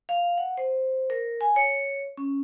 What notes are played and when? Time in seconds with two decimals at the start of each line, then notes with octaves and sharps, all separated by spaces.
0.09 F5
0.38 F#5
0.57 C5
1.10 A#4
1.41 G#5
1.56 C#5
2.18 C#4